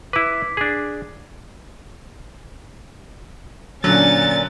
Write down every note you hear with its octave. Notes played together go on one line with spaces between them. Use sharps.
E4 B4 D6 B6
D4 G#4
A#2 D3 F#3 C#4 A6